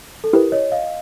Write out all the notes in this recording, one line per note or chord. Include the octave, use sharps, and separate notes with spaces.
A4
E4 G4 A#4 B4
C#5 D#5
D#5 F5